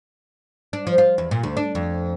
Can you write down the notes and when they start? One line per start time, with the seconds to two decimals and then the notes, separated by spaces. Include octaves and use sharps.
0.73 D4
0.87 F3
0.98 F4
1.18 E2
1.31 A#2
1.43 D2
1.57 D4
1.75 F2